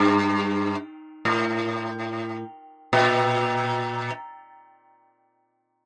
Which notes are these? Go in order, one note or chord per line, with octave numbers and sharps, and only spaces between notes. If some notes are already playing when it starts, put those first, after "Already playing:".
Already playing: G2
A2
A#2